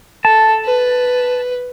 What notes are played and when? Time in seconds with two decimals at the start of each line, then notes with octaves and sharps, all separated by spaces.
0.25 A4 A5
0.65 B4